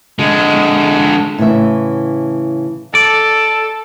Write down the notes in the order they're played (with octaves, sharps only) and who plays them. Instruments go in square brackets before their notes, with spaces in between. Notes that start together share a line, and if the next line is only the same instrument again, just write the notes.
[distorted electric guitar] D3 G#3
[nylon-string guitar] A2 C#3 E3 E5
[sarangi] A4 [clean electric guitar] D5